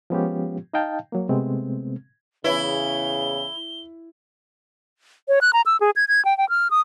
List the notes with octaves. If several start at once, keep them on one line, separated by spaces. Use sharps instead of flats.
F3 G#3 B3 C#4 F4 G4
D#4 D#5 F5 G5 A5
F#3 A#3
C3 G#3 A3 B3 C4
E2 C#3 E4 B4 C#5 E5 G7
C#5
F#6
A#5
E6
G#4
G#6
G#6
G5
G5
F6
D#6